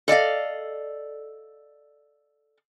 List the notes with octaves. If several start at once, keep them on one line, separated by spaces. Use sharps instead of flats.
A4 D5 D#5 F5